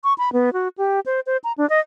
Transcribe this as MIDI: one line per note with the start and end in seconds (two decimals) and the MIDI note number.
0.04 0.13 85
0.18 0.32 83
0.33 0.53 59
0.53 0.68 66
0.78 1.00 67
1.06 1.20 72
1.26 1.37 72
1.44 1.53 82
1.58 1.68 62
1.70 1.80 75